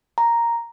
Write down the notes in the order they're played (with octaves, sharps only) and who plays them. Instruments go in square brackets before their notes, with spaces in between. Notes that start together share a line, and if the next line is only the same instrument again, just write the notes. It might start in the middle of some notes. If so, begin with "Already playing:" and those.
[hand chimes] A#5